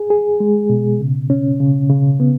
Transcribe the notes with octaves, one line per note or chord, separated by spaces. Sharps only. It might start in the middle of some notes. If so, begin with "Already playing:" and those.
Already playing: G#4
G#4
G#3
B2
C#3
C#4
C#3
C#3
B3